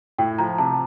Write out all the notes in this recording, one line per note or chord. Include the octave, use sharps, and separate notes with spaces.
A2 G5
F3 A#5
C3 A5